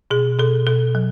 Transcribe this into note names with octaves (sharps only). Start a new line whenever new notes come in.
B2 G#4
B2 A4
B2 A4
F#3